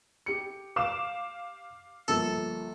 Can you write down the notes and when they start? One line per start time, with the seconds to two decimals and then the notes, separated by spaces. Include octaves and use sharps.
0.26 G4 C#7
0.76 F5 D6 E7
2.08 G1 F3 A#3 A4